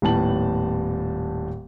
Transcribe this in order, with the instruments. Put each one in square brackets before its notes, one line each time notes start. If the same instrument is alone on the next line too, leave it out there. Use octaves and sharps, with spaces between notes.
[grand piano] D#1 A2 B3 A5 F#7